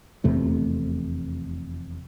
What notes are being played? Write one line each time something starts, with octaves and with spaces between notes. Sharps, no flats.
F1 E2 C3 A3